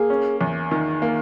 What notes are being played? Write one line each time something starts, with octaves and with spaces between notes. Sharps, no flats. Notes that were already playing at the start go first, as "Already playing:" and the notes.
Already playing: A#3 G#4
C#4
E2
D#3
A#3